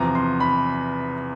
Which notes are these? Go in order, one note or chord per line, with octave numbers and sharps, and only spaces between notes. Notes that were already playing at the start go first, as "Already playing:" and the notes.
Already playing: E2 C3 F3 A#5
C6
B5